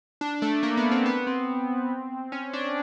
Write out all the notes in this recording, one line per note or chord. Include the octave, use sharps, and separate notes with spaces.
D4
A3
A#3
B3
C4
B3
C4
C#4
D4